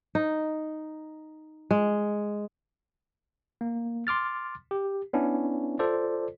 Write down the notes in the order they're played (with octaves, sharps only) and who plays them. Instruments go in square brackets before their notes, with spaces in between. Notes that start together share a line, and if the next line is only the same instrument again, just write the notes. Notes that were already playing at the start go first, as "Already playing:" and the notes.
[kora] D#4
G#3
[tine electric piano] A#3
C6 D6 F6 A6
G4
B3 C#4 D4 E4
F4 A4 C5 D5